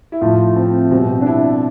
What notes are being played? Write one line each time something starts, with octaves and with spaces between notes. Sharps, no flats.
E4
A2 F3 F4
C4
B2 G3 C4
D4
E4